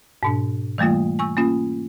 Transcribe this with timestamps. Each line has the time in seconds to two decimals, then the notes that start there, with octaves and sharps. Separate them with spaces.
0.23 G#2 B2 D4
0.78 E3 G3 A3 A#3 F4
1.19 G#5 C#6 E6
1.37 A#3 C#4 F4